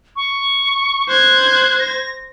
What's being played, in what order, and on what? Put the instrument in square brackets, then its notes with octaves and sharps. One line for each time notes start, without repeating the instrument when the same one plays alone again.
[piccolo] C#6
[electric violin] C5 G#6 [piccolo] F#6
[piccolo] A#6